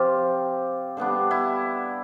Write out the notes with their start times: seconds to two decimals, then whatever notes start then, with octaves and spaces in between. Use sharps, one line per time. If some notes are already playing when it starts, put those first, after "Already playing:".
Already playing: C3 F3 C4 F4 G4
0.97 D3 G3 B3 D4
1.31 E4